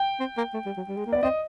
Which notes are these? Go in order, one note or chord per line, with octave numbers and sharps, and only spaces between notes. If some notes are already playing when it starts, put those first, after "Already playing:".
Already playing: G5
C4
A#3
A3
G3
F#3
G3
G#3
A#3
B3 D5
C4 D#5